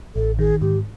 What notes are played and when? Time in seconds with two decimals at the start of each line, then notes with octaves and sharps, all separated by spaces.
0.15 A1 A4
0.39 D#3 G#4
0.61 G#2 G4